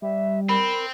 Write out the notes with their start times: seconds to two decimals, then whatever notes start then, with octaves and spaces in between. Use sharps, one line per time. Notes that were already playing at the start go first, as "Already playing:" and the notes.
0.02 G3 E5
0.49 C4 A#4 B5